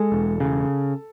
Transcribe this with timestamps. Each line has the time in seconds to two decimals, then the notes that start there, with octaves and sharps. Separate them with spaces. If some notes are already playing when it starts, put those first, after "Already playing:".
Already playing: G#3 A4
0.12 E1
0.40 C#3